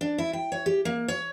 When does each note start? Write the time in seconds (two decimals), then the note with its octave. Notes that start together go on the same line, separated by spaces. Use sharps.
0.01 D4
0.18 E4
0.33 G5
0.52 C#5
0.66 G4
0.85 A#3
1.08 C#5